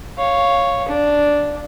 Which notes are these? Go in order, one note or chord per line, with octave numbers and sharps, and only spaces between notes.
C#5 F5
D4